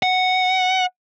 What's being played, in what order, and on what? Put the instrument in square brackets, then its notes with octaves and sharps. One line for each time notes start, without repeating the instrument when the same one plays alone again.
[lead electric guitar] F#5